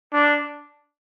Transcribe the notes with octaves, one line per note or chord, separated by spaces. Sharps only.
D4